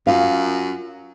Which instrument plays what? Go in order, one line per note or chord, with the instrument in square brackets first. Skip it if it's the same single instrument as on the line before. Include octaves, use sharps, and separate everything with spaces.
[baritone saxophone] F#2 [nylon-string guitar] F4 F5